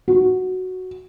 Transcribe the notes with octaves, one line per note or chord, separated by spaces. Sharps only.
F#4